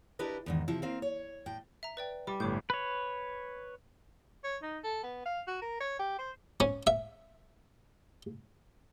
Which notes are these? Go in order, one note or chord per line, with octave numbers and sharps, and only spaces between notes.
D4 E4 G4 A#4 B4 D#5
E2 G#2 D#3
C3 F3 E4
A#3 C4 F5
C#5
A2 G5
E5 A#5
B4 D5 G5
G3 D6
G1 A2 D6 G6
B4 C#5
C#5
D#4
A4
B3
F5
F#4
A#4
C#5
G4
C5
C#4
E5